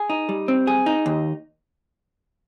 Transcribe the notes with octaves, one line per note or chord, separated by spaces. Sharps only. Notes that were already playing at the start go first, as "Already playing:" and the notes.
Already playing: G#4
D#4
G3
C4
G#4
D#4
D#2